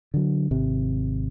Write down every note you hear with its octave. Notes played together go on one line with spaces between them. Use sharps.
D3 F#3
G#1 C3